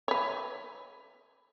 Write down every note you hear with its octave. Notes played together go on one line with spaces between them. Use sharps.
B4 C#5